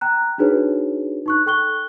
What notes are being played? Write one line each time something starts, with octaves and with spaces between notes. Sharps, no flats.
G5 A#5 F#6
D4 D#4 F#4 G#4 B4 C#5
D#4 C#6 F#6
A4 G5 C#6 F#6 G7